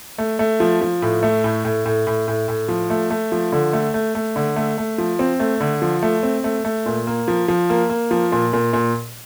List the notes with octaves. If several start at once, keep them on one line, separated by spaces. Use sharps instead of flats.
A3
A3
F3
F3
A2
A3
A2
A2
A2
A2
A2
A2
F3
A3
A3
F3
D3
A3
A3
A3
D3
A3
A3
F3
C4
A3
D3
F3
A3
C4
A3
A3
A#2
A#3
F3
F3
A#3
A#3
F3
A#2
A#2
A#2